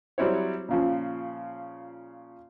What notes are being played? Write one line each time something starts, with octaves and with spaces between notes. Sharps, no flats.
F#3 G3 C4 E4 C#5
A#2 C#3 F3